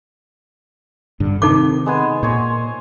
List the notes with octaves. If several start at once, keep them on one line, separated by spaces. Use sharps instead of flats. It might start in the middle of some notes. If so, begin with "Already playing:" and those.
G2 D3
C3 D#3 D#4 A4 D6
G#3 B3 G#5
A#2 C5 C#5 G#5